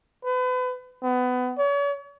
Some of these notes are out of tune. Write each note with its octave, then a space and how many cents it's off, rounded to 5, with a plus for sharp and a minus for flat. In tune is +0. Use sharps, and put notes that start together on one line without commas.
B4 +35
B3 +25
C#5 +40